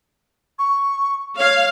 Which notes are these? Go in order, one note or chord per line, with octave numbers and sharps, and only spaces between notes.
C#6
C#5 F5